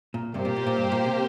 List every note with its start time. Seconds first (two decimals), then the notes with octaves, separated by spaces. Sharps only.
0.14 A#2
0.34 G2 C3 A#3 G4 C5
0.45 A#2
0.56 A#2
0.67 A#2
0.77 G2
0.92 A#2
1.06 C3